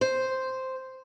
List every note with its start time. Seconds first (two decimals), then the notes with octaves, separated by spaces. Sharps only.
0.01 C5